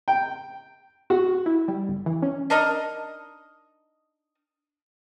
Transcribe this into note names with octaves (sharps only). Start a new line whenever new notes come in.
G5
F#4
E4
G3
G1
E3
C#4
D4 D#4 A#4 D#5